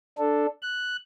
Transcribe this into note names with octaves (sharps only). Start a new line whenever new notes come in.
D4 A4
F#6